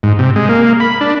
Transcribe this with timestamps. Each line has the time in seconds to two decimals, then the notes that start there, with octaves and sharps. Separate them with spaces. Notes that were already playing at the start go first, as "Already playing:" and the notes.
0.03 G#2
0.19 C3
0.36 G#3
0.49 A#3
0.80 B5
1.01 D4